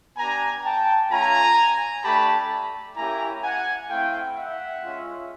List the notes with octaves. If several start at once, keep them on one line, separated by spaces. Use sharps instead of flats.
B3 D4 G4 G#5 A#5
G5 A5
A3 C#4 F4 G#5 A#5
A3 D4 G4 A5 B5
A#3 C#4 E4 G4 G#5 A#5
F#5 G#5
A3 C4 E4 F5 G5
E5 F#5
G#3 C#4 F4